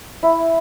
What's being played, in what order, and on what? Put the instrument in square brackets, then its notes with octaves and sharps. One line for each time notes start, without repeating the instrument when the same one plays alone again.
[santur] E4